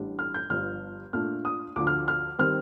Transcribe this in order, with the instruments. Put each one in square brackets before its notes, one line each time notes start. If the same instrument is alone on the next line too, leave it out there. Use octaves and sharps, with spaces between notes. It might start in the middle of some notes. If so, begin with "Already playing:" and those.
Already playing: [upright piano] A1 A2 G3 D4
F6
G6
G1 G2 F3 F6
A#2 A3 D4 F6
D#6
D2 D3 F3 D6
F6
F6
D#3 G3 C4 F6